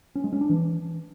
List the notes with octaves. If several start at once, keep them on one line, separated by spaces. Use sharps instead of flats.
C#4
G#3
C#4
D4
E3